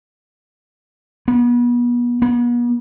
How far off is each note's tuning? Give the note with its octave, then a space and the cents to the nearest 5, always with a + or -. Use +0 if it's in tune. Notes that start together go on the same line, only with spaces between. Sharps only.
B3 -35
B3 -45